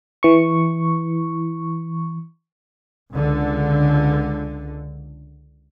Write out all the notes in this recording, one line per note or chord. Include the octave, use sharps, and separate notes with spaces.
E3 C#6
C#2 D3